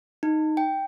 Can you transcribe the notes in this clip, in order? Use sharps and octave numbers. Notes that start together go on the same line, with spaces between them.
D#4
G5